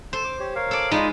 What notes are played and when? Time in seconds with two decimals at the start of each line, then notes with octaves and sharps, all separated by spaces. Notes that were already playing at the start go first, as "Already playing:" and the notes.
0.13 A4 C5
0.24 D6
0.40 G4 C#5
0.55 A#4 C#5 F5
0.71 A4 D5
0.92 G#3 D#4 F4 C5 B5